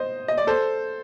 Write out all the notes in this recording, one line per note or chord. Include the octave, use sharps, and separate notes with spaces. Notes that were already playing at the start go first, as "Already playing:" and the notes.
Already playing: C5 D#5
D#5
D5
A4 C5